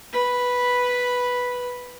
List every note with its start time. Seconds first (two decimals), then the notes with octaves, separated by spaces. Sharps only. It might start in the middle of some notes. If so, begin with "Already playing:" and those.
0.13 B4 B5